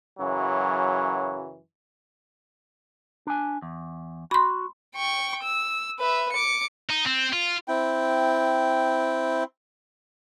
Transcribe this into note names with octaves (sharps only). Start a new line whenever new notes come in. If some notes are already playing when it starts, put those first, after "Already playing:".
F#2 C#3 E3 F#3
D4 G#5
E2
F#4 B5 C6
G5 C#6
E6
B4 E5
D6 C#7
D#4
C4
F4
C4 E4 G5